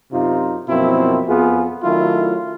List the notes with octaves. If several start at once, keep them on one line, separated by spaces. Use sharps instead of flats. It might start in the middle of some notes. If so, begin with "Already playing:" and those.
F#2 C3 D#4 F4
F#2 B2 F3 A#3 C4 E4
F2 B3 F4 G#4
D#3 F#3 A3 C#4 E4 F4